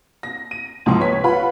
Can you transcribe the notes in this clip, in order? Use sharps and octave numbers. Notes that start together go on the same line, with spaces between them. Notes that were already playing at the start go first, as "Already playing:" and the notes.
A#6
D#7
C#2 G#2 F3 G5 C6
B4 C#5 B6
F4 B4 F#5 B5